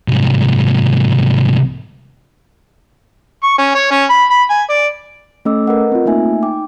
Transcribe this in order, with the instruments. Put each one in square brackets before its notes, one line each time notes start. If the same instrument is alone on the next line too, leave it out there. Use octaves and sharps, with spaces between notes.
[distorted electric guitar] C2 G#2
[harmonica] C#6
C#4
C#5
C#4
B5
B5
G#5
D5
[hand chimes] A3 C#4 A4 D#5 D6 E6
A#4 B4 D#5 F#5
C4 F4
A3 A#3 D#4 E5 G#5
D#4 G5 D6